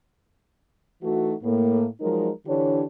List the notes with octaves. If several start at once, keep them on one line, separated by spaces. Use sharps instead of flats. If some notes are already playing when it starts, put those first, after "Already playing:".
E3 A3 D#4 F#4
A2 A#3
F3 F#3 G#3 D#4 A#4
D3 E3 D4 G4 C#5